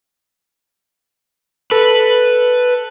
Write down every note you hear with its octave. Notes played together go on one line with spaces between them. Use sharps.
A4 B4